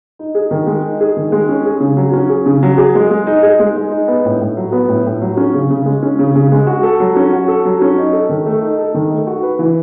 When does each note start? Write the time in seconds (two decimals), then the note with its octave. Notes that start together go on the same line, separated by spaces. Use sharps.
0.19 D#4
0.35 G#4
0.51 D#3
0.67 G#3
0.83 D#4
1.01 G#4
1.17 D#3
1.32 G#3
1.49 C#4
1.65 G#4
1.80 C#3
1.97 F#3
2.13 C#4
2.30 G#4
2.46 C#3
2.63 F#3
2.78 G#4
2.95 G#3
3.10 G#3
3.27 D#4
3.43 G#4
3.59 G#3
3.76 G#3
3.91 D#4
4.08 B3
4.25 A2
4.41 A2
4.57 F#3
4.72 B3
4.89 A2
5.06 A2
5.22 F#3
5.37 C#4
5.54 C#3
5.70 C#3
5.86 G#3
6.02 C#4
6.19 C#3
6.36 C#3
6.52 G#3
6.67 F#4
6.83 A4
7.00 F#3
7.16 C#4
7.33 F#4
7.48 A4
7.65 F#3
7.82 C#4
7.97 D#4
8.13 A4
8.29 D#3
8.46 A3
8.61 D#4
8.78 A4
8.95 D#3
9.11 A3
9.27 F#4
9.43 B4
9.59 E3